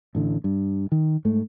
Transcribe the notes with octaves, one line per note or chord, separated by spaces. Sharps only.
A1 A2 D3
G2
D#3
G#2 A3